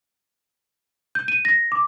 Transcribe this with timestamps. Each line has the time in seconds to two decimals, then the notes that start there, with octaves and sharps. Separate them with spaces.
1.15 G6
1.28 D#7
1.45 A#6
1.72 D6